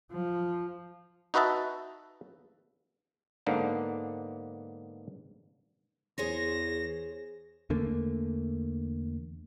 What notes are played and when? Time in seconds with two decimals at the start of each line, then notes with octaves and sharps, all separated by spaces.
0.11 F3
1.34 D#4 F#4 B4 D#5 E5 A5
3.46 G#2 D3 A#3 B3 D4
6.18 E2 G#4 C5 C#5 A#6
7.70 E2 D3 A3 A#3